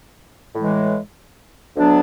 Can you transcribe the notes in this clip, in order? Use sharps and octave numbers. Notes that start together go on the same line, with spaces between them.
A2 E3 G#3
D2 D3 F#3 B3 D4